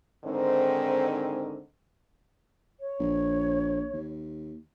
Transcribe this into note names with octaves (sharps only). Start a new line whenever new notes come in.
G#2 D3 D#3 C4
C#5
A#1
D#2